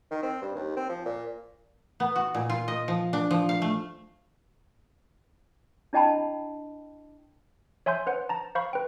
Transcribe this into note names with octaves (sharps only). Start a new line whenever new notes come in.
D#3
C4
G2
D#2
C4
F3
A#2
B3
F#4
A#2
F4
D#5
F3
D4
F3
F5
A3
D4 E4 D#5 G5 A5 B5
C#5 E5 G#5 C6 G6
B4 C5 F#5
A5 A#5
C5 F5 B5 C#6
B4 G5